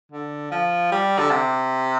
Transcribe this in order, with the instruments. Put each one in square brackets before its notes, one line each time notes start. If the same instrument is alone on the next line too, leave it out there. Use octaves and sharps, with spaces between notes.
[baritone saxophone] D3
F3
G3
D3
C3